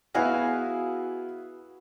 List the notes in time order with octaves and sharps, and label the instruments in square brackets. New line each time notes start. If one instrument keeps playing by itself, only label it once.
[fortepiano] B3 E4 G#4 [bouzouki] F#4 F5 G#5